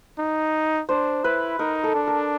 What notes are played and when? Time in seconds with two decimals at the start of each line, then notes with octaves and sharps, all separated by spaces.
0.19 D#4
0.89 D4 C5
1.24 E4 B4
1.59 D#4 A#4
1.84 A4
1.95 D4
2.07 A#4